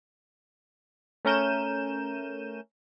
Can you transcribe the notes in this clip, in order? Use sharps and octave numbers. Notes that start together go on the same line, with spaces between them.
A3 C#4 A#4 G6 D#7 E7